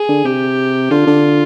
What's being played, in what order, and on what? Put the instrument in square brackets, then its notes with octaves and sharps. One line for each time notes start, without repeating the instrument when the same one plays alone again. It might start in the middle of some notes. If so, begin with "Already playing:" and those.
Already playing: [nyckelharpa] G#4
[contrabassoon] D3
[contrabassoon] C3 [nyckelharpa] G4
[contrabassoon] D3 [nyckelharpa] F4
[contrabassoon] D3